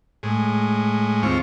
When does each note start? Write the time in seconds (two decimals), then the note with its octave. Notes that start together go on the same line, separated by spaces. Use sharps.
0.23 A2 G#3
1.23 D#2 C4 F4 C#6